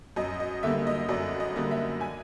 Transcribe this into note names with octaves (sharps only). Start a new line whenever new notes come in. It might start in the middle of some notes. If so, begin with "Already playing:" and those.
F#2 D#5
D#5
D3 G3 A#3 E5
D#5
F#2 D5
D#5
D3 G3 A#3
E5
G#5